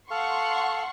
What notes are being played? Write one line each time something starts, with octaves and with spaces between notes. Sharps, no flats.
A4 F5 F#5 C6 C#6